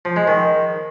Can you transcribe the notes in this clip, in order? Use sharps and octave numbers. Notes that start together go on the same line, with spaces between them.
F3
G#3
D#3